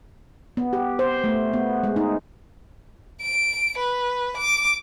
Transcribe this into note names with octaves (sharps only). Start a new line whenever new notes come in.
B3
G4
C5
A3
B3
G#3
D#4
D7
B4
D6